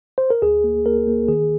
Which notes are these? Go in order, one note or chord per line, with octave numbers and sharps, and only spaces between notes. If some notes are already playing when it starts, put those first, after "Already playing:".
C5
A#4
D2 G#4
A#3
A#3 A#4
A#3
D#3 G#4